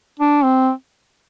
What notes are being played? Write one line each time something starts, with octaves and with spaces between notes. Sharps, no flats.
D4
C4